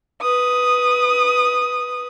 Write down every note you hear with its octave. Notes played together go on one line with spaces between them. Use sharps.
B4 D#6